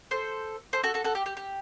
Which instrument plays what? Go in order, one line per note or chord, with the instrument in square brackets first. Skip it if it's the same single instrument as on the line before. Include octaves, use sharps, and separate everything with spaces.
[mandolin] A4 C5
A4 C5
F#4 A4
F#4 A4
F#4 A4
G4
G4
G4